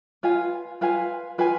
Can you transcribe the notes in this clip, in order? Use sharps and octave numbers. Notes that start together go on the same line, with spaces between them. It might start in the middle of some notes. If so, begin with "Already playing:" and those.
F4 B4 F5 G#5
F4 B4 F5 G#5
F4 B4 F5 G#5